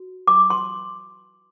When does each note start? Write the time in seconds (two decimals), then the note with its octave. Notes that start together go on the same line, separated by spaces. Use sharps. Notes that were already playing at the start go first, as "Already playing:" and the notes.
Already playing: F#4
0.28 D6
0.50 C6